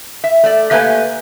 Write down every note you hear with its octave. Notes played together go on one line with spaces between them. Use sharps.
E5
A3 D5
A3 A#3 G4 B4 G#5